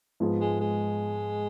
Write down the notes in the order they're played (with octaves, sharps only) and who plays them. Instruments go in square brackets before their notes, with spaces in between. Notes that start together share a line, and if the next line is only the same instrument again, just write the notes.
[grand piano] G#2 F3 B3 F4 G#4
[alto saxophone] G#3
G#3